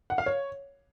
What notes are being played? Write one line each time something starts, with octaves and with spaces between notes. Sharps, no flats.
F#5
F5
C#5